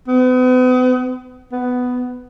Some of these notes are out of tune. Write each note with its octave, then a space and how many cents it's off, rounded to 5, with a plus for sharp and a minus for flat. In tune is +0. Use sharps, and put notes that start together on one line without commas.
B3 +40
B3 +10